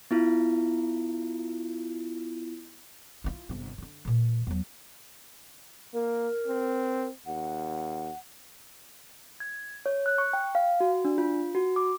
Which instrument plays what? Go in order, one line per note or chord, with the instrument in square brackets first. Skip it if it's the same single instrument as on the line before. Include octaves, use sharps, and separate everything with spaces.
[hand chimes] B3 E4 F4
[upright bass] E4 F4
G1 C3
D3 D4
A#2 E3
E2 F#3
[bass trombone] A#3 [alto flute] A#4
[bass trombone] C4
[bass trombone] D#2 [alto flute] F#5
[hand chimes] G#6
C#5
F#6
C#6
G5
F5
F#4
D4
F4
F#4
D6